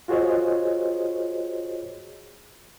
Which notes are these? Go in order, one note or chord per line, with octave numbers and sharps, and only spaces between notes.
F4 F#4 G#4 C5 C#5 D#5